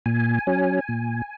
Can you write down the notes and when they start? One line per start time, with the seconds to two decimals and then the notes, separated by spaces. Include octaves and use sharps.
0.06 A#2 G#5
0.47 F#3 C#4
0.89 A#2